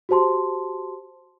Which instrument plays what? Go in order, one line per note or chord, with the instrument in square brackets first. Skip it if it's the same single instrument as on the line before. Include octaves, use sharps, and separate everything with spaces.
[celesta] F#4 G4 C5 A5 C6